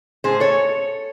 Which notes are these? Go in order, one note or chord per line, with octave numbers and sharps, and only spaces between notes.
A2 G#4 C5
A2 A4 C#5